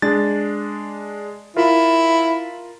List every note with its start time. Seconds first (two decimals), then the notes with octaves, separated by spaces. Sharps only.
0.02 G#3 D4 A6
1.57 E4 F4 A#4